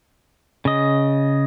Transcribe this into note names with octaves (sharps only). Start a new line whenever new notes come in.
C#3 D#5